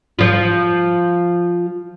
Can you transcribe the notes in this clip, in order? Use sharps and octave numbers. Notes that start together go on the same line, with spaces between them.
F3 F4